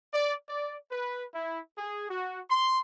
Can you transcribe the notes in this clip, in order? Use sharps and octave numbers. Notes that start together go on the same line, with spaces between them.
D5
D5
B4
E4
G#4
F#4
C6